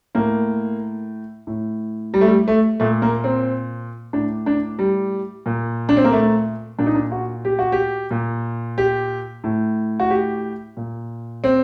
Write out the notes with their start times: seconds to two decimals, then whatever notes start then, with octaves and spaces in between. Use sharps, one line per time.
0.15 A2 A#3
1.47 A2
2.14 G3
2.21 A3
2.27 G3
2.48 A3
2.80 A#2 A3
3.02 A#3
3.24 C4
4.13 A2 D4
4.46 D4
4.79 G3
5.46 A#2
5.89 D4
5.97 C4
6.04 A#3
6.12 A3
6.79 A#2 D4
6.86 D#4
6.95 D4
7.12 F#4
7.45 G4
7.59 F#4
7.72 G4
8.11 A#2
8.78 G4
9.44 A2
10.00 F#4
10.10 G4
10.77 A#2
11.44 C4